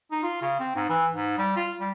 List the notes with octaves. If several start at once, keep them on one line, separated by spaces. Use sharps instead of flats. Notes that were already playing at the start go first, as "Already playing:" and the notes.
D#4
F4
C#3
C4
G#2
E3
G#2
G3
F4
G3